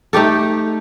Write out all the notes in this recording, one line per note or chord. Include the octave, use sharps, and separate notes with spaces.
A3 D#4 G4 A4